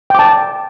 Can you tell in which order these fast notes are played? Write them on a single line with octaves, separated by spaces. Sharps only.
G5 D6 A5